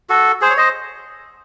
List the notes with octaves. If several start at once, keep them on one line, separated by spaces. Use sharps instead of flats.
F#4 A4
G#4 C5
C#5
C5 D#5